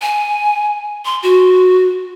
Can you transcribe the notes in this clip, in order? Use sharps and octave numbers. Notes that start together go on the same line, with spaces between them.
G#5
C6
F#4